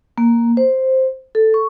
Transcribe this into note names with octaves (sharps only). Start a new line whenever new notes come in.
A#3
C5
A4
C#6